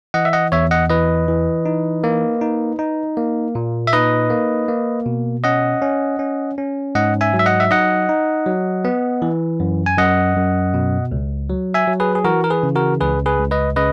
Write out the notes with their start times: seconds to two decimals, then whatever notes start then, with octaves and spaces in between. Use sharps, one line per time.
0.14 E3 D#5 F#5
0.25 E5
0.33 D#5 F#5
0.52 E2 C#5 E5
0.71 D#5 F#5
0.90 E3 B4 D#5
1.28 E3
1.66 D#4
2.04 A#3
2.41 D#4
2.79 D#4
3.17 A#3
3.55 A#2
3.87 E5
3.93 D#4 B4 D#5
4.30 A#3
4.68 A#3
5.06 B2
5.44 C#4 D#5 F#5
5.82 C#4
6.19 C#4
6.58 C#4
6.95 G#2 D#5 F#5
7.21 E5 G#5
7.33 F#3
7.39 E5
7.46 D#5 F#5
7.60 E5
7.71 D#4 D#5 F#5
8.09 D#4
8.46 F#3
8.85 B3
9.22 E3
9.60 F#2
9.86 G#5
9.98 F#2 D#5 F#5
10.36 F#2
10.74 B2
11.12 C#2
11.50 F#3
11.74 E5 G#5
11.88 F#3
12.00 G#4 B4
12.15 G#4
12.25 E3 F#4 A#4
12.44 A#4
12.50 G#4 B4
12.63 C#3
12.75 F#4 A#4
13.01 C#2 G#4 B4
13.26 G#4 B4
13.39 C#2
13.51 B4 D#5
13.76 C#3 B4 D#5